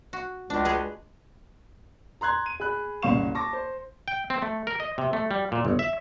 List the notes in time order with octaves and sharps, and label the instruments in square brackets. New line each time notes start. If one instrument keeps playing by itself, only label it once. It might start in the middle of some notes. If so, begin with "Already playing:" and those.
[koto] F#4
[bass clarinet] C#2 [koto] D4
[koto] G#3 G#4 B4
[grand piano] A#5 C6 F#6 G#6
D#7
G#4 B5 F#6
F#1 C2 C#4 F5 C#6 E7
A5 C#6 D6 A#6
C5
[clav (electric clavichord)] G5
C4
A3
A#4
D#5
C3
A3
G3
A#2
G1
E5